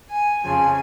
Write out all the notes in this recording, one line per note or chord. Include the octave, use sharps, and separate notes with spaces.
G#5
F2 C#3 F3 G#5